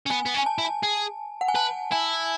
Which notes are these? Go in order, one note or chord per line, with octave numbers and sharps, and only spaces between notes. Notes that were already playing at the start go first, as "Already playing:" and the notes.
C#4
B3 G#5
B3
C#4
G#5
A5
E4
A5
G#4
F#5
G#5
B4 A5
E4 G#5